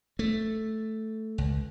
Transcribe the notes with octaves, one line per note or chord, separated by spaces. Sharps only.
A3
C#2